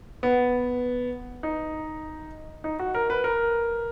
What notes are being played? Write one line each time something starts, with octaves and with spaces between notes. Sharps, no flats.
B3
D#4
D#4
F#4
A#4
B4
A#4